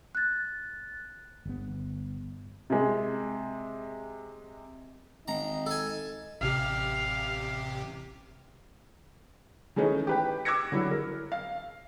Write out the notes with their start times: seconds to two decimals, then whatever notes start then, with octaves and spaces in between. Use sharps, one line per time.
0.15 F#6 A6
1.46 G1 B3
2.70 C3 G#3
5.28 G#1 D#4 A#5
5.66 A4 G#5
6.41 A1 C3 G4 F5
9.76 D#3 E3 G#3 A3 C#4 D#4
10.07 G4 B4 G5
10.45 D6 E6 F#6 G#6 A#6 C#7
10.72 D3 F#3 E4
10.91 A#4
11.32 F5